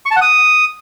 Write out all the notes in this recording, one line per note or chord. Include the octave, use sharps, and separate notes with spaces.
C#6
A5
F#5
D#6